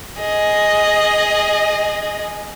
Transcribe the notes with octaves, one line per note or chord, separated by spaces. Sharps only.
G#4 D#5